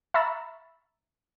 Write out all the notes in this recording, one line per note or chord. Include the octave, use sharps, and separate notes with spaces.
E5 A#5 B5 C#6 E6 A6